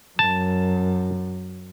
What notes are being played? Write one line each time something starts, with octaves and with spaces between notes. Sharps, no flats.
F#2 A5